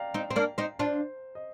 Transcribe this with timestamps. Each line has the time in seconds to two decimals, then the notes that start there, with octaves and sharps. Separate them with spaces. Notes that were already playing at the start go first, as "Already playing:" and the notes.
Already playing: D5 F5 G5 A#5
0.14 C4 D#4
0.30 C4
0.36 A#3 D4
0.58 C4 D#4
0.79 D4 F4 C5
1.35 D#5